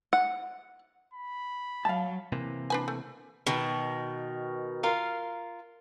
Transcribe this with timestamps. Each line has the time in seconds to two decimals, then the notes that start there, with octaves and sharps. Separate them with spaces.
0.13 F#5
1.14 B5
1.85 F#3 F5 A5
2.32 C3 E3 A#3
2.70 D4 B4 G#5
2.88 A3
3.47 B2 D#3
4.83 F4 A#4 F5